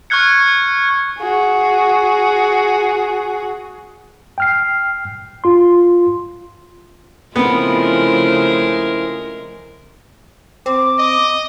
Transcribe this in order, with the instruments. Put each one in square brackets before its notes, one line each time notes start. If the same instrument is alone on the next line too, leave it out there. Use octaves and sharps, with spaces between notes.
[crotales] C#6 F6 F#6 G#6 C#7
[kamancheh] F#4 G#4
[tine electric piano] G5 F6 C7
F4 C6
[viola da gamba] C#3 F3 A3 [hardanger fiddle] G#3 A#4 [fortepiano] B3 [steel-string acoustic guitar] C4 E4
[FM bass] C4 [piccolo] D6
[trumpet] D#5